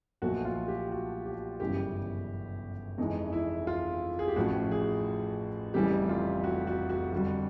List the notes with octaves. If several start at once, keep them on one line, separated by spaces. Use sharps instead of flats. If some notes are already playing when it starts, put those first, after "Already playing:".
B1 A#2 F3 A3 F#4
F4
G4
F#4
G4
G1 F#2 C#3 E3 G3 G4
F2 C3 E3 G#3 D#4
E4
F4
G#4
G4
A1 A2 F3 F#4
G#4
F1 F2 C#3 E3 G3 G4
F4
F#4
F#4
F#4
F2 D3 G3 F#4